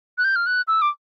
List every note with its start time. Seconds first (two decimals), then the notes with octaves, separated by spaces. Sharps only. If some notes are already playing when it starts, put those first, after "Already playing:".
0.18 F#6
0.24 G6
0.36 F6
0.46 F#6
0.68 E6
0.82 D6